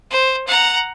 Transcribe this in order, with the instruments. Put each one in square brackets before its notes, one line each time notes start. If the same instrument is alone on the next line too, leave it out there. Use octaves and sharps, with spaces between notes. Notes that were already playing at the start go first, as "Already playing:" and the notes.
[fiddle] C5
F#5 A#5